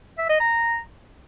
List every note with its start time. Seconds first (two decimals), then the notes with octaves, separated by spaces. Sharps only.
0.18 E5
0.29 D#5
0.40 A#5